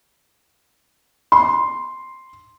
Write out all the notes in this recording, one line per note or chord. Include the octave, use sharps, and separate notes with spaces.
C6